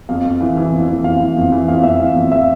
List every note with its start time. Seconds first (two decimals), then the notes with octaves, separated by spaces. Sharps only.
0.09 F2 F5
0.24 F2
0.41 E3
0.57 E3
0.72 F2
0.88 E3
1.04 F2 F5
1.20 E3
1.36 F2
1.52 E3
1.68 F2 F5
1.83 F2 E5
2.00 E3 F5
2.16 F2
2.32 E5